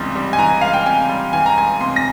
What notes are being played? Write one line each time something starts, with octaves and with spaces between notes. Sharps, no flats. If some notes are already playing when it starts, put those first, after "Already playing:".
Already playing: C#2 C3 E3 G3 C6
G3
G#5
E3 A#5
C#2 F5
G5
C3 G#5
G3
E3 G#5
A#5
C#2 G#5
C3 C6
A#6